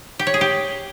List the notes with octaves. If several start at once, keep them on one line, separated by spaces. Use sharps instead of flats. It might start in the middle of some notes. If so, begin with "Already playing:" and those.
G4
C#5
G#4
G4